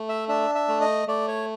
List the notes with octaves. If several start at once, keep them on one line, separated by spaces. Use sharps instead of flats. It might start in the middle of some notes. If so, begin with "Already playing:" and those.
Already playing: A3
E5
D4 E5
E5
A3
D#5
A3 D5
C#5